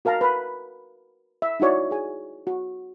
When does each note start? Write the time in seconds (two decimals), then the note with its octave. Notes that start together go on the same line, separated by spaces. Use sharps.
0.05 F#4 A#4 F5 A5 A#5
0.21 B4 B5
1.42 E5
1.60 D#4 E4 F#4 C#5 D5
1.91 G#4 G#5
2.47 F#4